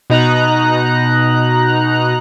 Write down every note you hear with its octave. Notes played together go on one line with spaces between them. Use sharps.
B2 D#4 A#5 F#6